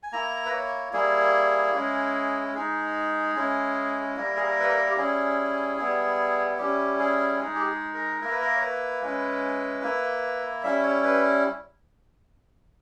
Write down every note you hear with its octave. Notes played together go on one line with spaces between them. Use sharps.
G#5
A#3 E4 A#5
B4
C#5
G3 A#3 E4 G#4
G#3 C#4 E4
G#3 D#4 G#4
G#3 C#4 E4
G3 A#3 E4 A#4
G#4
A#4
B4
A#4
G4
G3 C#4 E4 G#4
G3 B3 E4
G3 C#4 E4 G4
G#4
G#3 D#4 G#4
G4
G#4
A#4
A#3 E4 A#4
B4
A#4
C#5
B4
G#3 C#4 E4
A#3 E4
G3 C#4 E4 E5
C#5
B4